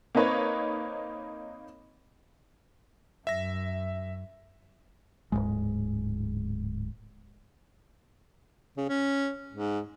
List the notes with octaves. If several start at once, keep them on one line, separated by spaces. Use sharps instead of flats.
A#3 C4 D#4 B4 C#5
F#2 E5 A#6
D1 C#2 G#2 G#3
C#3
C#4
G#2